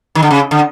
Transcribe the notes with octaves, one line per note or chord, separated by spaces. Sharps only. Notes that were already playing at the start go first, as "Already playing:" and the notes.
D#3
D3
C#3
D3